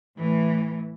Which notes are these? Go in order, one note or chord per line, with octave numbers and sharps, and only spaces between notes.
A2 E3